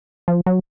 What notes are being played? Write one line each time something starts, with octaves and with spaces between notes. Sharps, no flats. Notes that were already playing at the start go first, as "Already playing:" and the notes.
F3
F#3